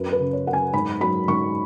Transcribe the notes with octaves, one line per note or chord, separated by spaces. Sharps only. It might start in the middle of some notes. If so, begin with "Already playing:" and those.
Already playing: F#2 F#3 B4
B4
C#3
C#5
F#2 F#5
G#5
G#2 B5
F#3 B5
G#2 C#6